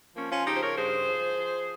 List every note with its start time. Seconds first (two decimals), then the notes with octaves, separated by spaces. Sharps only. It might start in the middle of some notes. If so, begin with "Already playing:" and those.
0.15 F3 A#3 C#4
0.30 C#4 F4
0.46 C#3 D#4 G4
0.55 C5
0.62 A#4 C#5
0.77 G2 G#4 C5
1.07 F3
1.37 F3